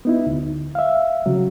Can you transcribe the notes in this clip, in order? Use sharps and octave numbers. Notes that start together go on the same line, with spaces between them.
B3 D#4 E4
D2
E5 F5
C#3 F#3